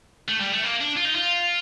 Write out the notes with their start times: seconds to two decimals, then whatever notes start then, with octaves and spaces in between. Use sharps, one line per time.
0.29 A3
0.41 G3
0.53 A3
0.64 A#3
0.81 D4
0.97 F4
1.05 D#4
1.16 F4